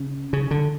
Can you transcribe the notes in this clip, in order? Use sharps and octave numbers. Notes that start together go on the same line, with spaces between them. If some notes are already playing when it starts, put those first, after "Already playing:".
Already playing: C#3
C#3
D3